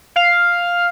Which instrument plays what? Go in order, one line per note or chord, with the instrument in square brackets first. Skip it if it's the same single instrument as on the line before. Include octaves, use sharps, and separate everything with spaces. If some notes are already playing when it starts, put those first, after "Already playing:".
[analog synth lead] F5